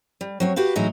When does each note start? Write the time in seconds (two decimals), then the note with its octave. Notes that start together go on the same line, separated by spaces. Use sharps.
0.21 G3
0.40 F#3 C4 C#5
0.56 F#4 G4 B4 F5
0.75 A2 E3 F#3 G#3 D#4 A#5